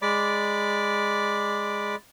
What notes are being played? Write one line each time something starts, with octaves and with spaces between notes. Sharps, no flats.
G#3 D5 B5 D6